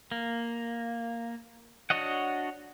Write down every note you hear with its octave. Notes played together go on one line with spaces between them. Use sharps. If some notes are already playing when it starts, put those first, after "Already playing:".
A#3
D4 F#4 C#5 D#5 F#5